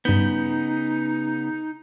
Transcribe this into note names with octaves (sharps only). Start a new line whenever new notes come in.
G2 C#3 B3 D#4 G6